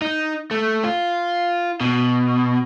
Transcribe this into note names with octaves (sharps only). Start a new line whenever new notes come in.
D#4
A3
F4
B2